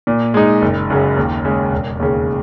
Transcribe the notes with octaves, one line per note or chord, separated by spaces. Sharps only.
A#2
G#3 D#4
F#1
F#2 C#3
D#2
C#3 G#3
E1
D#2 C#3